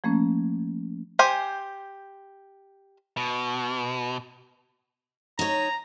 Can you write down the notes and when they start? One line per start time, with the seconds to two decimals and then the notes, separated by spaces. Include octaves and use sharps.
0.04 F3 A3 A#3 C#4
1.19 G4 C5 G#5
3.17 B2
5.39 D#4 C#5 A#5